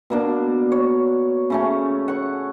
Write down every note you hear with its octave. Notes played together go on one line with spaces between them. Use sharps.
B2 A#3 D4
C#5
C#3 A3 C#4
F#5 C#6